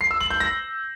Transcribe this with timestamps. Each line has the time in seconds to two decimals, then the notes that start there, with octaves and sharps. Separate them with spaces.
0.01 C7
0.11 E6
0.21 F#7
0.30 G6
0.40 A#6